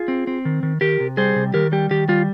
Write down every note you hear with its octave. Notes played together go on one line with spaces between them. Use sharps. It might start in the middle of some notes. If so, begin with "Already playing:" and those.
Already playing: F4 G#4
C4
C4
D#3
D#3
D#3 G4 A#4
C3
G3 G#4 C5
C3
D#3 G4 A#4
G3 G4
D#3 G4
G3 F4